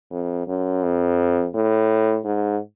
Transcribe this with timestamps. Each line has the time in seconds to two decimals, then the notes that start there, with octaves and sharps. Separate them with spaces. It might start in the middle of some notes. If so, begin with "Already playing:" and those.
0.11 F2
0.47 F#2
0.83 F2
1.54 A2
2.25 G#2